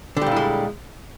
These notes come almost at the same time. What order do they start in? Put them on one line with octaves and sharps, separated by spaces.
D3 G3 A#2 E4 G#3